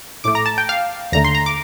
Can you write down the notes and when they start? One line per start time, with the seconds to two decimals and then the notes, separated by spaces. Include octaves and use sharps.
0.24 A#1 A2 A3 D6
0.35 A#5
0.46 A5
0.58 G5
0.69 F5
1.12 D#2 D3 A3 A#5
1.24 C6
1.35 A#5
1.46 D6